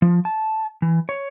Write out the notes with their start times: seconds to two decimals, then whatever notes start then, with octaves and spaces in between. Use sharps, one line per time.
0.02 F3
0.25 A5
0.82 E3
1.09 C#5